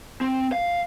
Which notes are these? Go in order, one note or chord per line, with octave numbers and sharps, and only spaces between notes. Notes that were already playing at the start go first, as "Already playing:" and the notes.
C4
F5